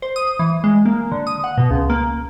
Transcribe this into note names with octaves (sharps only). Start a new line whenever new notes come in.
C5
D#6
E3
G#3
A#3
D3
D#6
F#5
B2
C#2
A#3